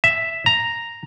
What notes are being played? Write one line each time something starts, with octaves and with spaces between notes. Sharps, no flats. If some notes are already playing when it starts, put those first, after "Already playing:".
E5
A#5